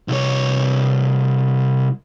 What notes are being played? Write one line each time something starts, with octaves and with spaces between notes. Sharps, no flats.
C2 C#5